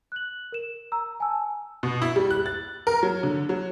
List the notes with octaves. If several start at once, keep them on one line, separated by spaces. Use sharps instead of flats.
F#6 F#7
A#4 E7
A#5 E6
G#5 A5 E6
B2
E4
G3
F#6
A6
A#4
F#3
D3
F#3